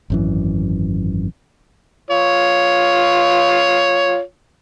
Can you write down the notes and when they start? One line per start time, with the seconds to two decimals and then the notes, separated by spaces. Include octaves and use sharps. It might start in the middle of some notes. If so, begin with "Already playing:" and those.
0.10 G#1 F#2 E3
2.11 F4 C#5